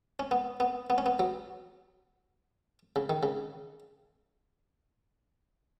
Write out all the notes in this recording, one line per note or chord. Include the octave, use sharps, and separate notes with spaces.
C#4
B3
B3
B3
C#4
B3
F#3
C#3
D#3
C#3